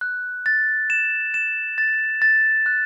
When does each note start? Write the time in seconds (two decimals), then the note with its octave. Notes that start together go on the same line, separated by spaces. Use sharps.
0.01 F#6
0.46 A6
0.90 E7
1.34 E7
1.78 A6
2.22 A6
2.66 F#6